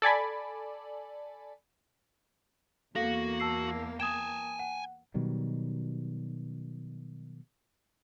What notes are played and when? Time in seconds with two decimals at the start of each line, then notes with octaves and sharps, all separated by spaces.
0.02 A4 D5 G#5 B5
2.96 E2 A#3 F#4 A4 F5 A#6
3.40 A5 E6 C7
4.00 G5 G#5 D#6 G#6 E7
4.59 F#5
5.14 B2 D#3 F#3 G3